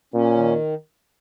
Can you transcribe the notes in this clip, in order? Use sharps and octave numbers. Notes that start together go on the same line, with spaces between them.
A#2 C#4
D#3